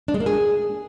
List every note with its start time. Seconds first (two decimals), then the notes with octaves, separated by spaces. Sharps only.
0.08 D4
0.14 G#3
0.20 A#3
0.26 G#4